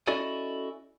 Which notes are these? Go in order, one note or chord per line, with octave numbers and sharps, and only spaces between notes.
C#4 E4 F#4 A4 D5 D#5